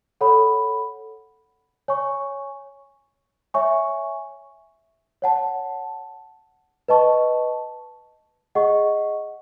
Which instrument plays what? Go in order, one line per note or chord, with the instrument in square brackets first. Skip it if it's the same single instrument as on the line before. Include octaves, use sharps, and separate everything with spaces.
[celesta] A4 C#5 F#5 B5
C#5 G#5 C#6
C#5 E5 G#5 C#6
C#5 F#5 A5
B4 D#5 A5 C#6
G#4 D#5 F#5 C#6